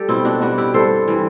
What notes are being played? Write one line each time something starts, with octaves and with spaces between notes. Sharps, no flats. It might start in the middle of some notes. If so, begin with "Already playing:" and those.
Already playing: G3 G4 A4
B2 C4 E4
D4 F#4
G3 D4 F#4
E4 G4
G2 A4 C5
E3 G3